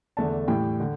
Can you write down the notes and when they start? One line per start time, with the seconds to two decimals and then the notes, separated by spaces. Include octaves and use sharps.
0.17 E2 D3 A3 D4 A5
0.48 A2 E3 G3 G5
0.80 D3